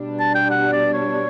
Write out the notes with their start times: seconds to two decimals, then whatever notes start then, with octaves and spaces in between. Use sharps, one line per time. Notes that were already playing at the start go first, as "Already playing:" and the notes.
Already playing: B2 G3 D4
0.19 A5
0.35 G5
0.51 F#5
0.73 D5
0.93 C#5